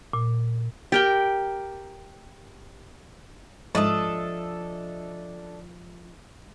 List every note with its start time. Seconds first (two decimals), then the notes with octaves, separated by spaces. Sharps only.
0.13 A#2
0.92 G4 A#4 G5
3.75 G#2 F3 D4 A4 D#5 E5 D#6